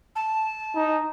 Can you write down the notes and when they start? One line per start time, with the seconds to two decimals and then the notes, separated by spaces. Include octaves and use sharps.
0.16 A5
0.75 D#4